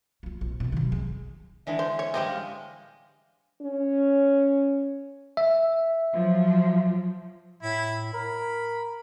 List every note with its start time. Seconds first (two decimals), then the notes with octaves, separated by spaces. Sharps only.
0.23 A#3 F4
0.41 A#1
0.60 A1 B2
0.72 B1 D#3
0.92 G#3
1.67 D3 E3 G#3 E5
1.79 C5
1.99 C#5
2.14 G3 G#3 G4 C5 D#5
2.26 F5
3.62 C#4
5.37 E5
6.13 F3 F#3
7.63 A2 E4 B5
8.14 A#4 B5